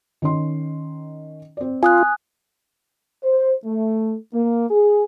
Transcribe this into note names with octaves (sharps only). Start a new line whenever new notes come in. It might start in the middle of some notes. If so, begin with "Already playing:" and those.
D#3 C#4 C6
C4 D5
F4 G#5 D#6 F#6
C5
A3
A#3
G#4